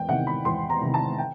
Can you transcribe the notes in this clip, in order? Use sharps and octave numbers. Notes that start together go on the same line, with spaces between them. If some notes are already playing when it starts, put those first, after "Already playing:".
Already playing: E2 G5
C3 D#3 F#5
B5
E2 C6
A#5
C3 D#3
A5
G5